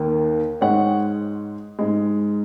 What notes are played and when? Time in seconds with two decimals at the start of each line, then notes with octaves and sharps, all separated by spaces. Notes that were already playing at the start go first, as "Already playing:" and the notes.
Already playing: D#2 D#3 A#3
0.61 G#2 G#3 C#5 F#5
1.79 G#2 G#3